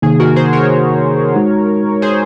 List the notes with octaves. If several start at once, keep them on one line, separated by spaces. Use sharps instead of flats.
C3 D#3 A#3 D#4 G#4
F#4 A#4
G#4 C5
A#4 C#5
G#3 D#4 F#4
G#4 C5